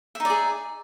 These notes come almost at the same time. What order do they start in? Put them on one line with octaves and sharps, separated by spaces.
E5 D#4 D5 G#4